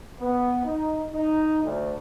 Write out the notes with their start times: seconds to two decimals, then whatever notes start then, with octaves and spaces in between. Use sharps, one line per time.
0.20 B3
0.64 D#4
1.12 D#4
1.64 D2